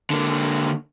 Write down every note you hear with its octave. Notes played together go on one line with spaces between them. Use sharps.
D3 A#3